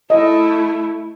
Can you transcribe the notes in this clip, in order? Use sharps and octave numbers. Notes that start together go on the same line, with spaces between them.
A3 E4 D#5